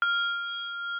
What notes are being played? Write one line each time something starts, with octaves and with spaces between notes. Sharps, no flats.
F6